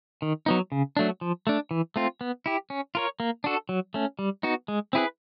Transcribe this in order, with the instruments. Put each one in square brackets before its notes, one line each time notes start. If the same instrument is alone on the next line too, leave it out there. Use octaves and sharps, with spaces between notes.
[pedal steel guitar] D#3
F#3 B3 D#4
C#3
F#3 A3 D4
F3
A3 D4
E3
A3 C4 F4
B3
E4 G4
C#4
F4 A#4 C#5
A#3
D4 F#4 A4
F#3
A3 C#4
G3
B3 D#4 F#4
G#3
C4 E4 G#4 B4